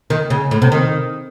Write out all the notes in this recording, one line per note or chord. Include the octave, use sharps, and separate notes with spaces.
D#3
C#3
A2
C3
D#3